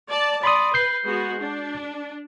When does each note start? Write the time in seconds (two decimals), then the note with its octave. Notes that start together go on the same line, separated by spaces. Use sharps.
0.11 D5 A5
0.43 D5 B5 C6 D#6
0.74 B4 G6 C7
1.06 G#3 B3 F#4
1.40 D4